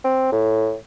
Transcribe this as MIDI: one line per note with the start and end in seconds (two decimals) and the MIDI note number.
0.04 0.29 60
0.32 0.75 45